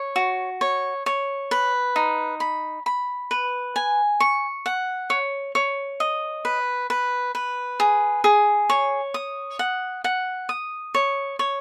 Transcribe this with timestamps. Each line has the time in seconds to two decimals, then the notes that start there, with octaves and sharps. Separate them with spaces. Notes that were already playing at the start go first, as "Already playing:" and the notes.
Already playing: C#5
0.16 F#4
0.61 C#5
1.06 C#5
1.51 B4
1.96 D#4
2.40 B5
2.86 B5
3.31 B4
3.76 G#5
4.20 C#6
4.66 F#5
5.10 C#5
5.55 C#5
6.00 D#5
6.45 B4
6.90 B4
7.35 B4
7.80 G#4
8.24 G#4
8.70 C#5
9.14 D#6
9.59 F#5
10.04 F#5
10.49 D#6
10.95 C#5
11.39 C#5